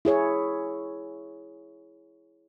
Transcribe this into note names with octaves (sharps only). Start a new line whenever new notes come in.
E4 G#4 C#5